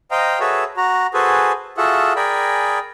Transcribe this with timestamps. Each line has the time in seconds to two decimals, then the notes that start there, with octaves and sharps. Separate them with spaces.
0.11 C5 D#5 F5 G5 A#5
0.40 F#4 G#4 A4 B4 C#5 E5
0.77 F#4 A#5
1.14 F#4 G#4 A4 B4 C5 G#5
1.77 F4 F#4 G#4 A4 E5 F#5
2.16 G#4 A#4 D5 G5 G#5 B5